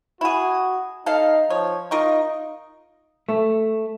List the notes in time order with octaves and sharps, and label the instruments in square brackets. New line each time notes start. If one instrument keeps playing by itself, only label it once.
[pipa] E4 G#4 [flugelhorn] F#4
[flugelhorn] D#4 [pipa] A4 F5
[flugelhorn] F3 [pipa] C#5
[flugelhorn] D#4 [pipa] F4 A#4 C#6
[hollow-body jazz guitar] A3